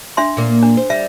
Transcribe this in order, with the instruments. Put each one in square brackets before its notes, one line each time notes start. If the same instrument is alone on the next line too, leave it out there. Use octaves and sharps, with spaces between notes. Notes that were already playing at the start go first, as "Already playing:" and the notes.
[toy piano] D4 E5 C6
[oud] A#2 A#3
[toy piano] D4
[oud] C5
[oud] G3 [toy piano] E5